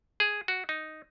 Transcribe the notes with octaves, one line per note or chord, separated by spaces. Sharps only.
G#4
F#4
D#4